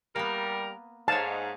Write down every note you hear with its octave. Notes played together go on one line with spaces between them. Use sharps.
G3 A#3 B3 A#4
G#2 C#5 F5 A5